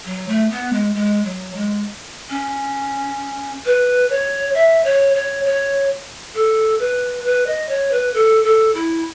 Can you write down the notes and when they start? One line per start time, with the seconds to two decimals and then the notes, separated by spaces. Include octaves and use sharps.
0.05 F#3
0.28 A3
0.50 B3
0.73 G#3
0.95 G#3
1.25 F#3
1.55 G#3
2.30 C#4
3.65 B4
4.10 C#5
4.55 E5
4.85 C#5
5.14 C#5
5.45 C#5
6.34 A4
6.79 B4
7.24 B4
7.47 D#5
7.69 C#5
7.92 B4
8.14 A4
8.44 A4
8.74 E4